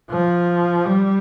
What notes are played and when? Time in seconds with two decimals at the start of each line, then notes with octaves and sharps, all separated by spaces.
0.10 F3
0.86 G3